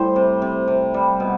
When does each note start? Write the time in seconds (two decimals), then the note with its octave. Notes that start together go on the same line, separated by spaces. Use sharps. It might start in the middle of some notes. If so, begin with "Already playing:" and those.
Already playing: A2 G3 C5
0.16 C3
0.42 C3
0.68 C3
0.94 G3
1.20 B2